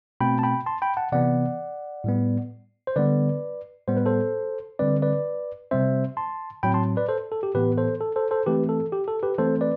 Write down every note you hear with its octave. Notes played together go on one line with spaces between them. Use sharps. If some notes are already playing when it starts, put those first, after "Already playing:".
B2 A3 C4 G5 B5
A5
G5 B5
A5 C6
G5 B5
F#5 A5
C3 E3 B3 D5 F#5
A2 G3 B3
C5
D3 G3 B3 B4 D5
A2 G3 B3 C5
B4
A4 C5
D3 G3 C4 B4 D5
B4 D5
C3 G3 C4 C5 E5
A5 C6
A2 F#3 C4 G5 B5
A5 C6
B4 D5
A4 C5
A4
G4
A2 E3 B3 G4 B4
A4 C5
A4
A4 C5
A4 C5
E3 A3 C4 G4 B4
A4
G4
A4
G4 B4
E3 A3 C4 A4 C5
B4 D5